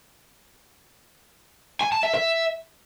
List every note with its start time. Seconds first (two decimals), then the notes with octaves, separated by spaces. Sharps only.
1.81 G#5
1.92 A5
2.03 E5
2.14 E5